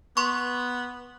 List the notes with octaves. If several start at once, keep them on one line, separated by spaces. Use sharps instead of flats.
B3 C6 C#6